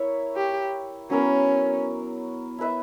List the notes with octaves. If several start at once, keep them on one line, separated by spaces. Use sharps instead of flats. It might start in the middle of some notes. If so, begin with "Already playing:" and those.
Already playing: E4 A#4 C#5 E5
G4
F#3 B3 C#4 E4 A#4
E4 B4 E5